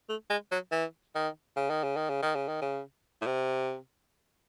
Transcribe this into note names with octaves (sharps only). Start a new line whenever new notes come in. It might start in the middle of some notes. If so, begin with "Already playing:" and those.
A3
G#3
F#3
E3
D#3
C#3
D#3
C#3
D#3
C#3
D#3
C#3
D#3
C#3
A2
C3